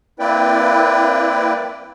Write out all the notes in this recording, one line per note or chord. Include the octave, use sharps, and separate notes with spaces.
A#3 C4 E4 B4 D5 G5